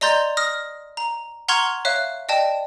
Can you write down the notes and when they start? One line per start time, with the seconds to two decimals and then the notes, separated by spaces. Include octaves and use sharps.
0.01 D5 D#5 A#5 C6 G6 A6
0.37 D#6 F6 A#6
0.97 A#5
1.49 F#5 A#5 C6 C#6 F6 G#6
1.85 C#5 E5 F5 F#6
2.29 D5 D#5 G5 A5